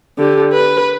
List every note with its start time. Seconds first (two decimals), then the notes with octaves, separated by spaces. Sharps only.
0.18 D3 G4
0.53 B4